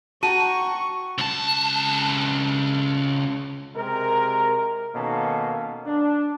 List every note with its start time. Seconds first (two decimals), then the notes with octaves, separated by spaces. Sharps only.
0.23 F#4 G5 A5 A#5 C#6 D#7
1.18 C#2 A5
3.76 C3 G#3 A#4
4.95 B2 D#3 A#3 C#4 A4
5.85 D4